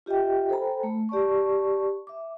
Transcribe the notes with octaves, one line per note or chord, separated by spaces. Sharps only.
F4 G4 D#5 E5 G5
A4 C5 G5 G#5 A#5 B5
A3
G4 D5 A5 C#6
E5 D6